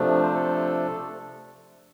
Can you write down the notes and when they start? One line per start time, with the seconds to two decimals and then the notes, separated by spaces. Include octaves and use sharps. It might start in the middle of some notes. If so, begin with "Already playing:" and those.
Already playing: C3 F3 A3 D4
0.23 C5
0.34 A4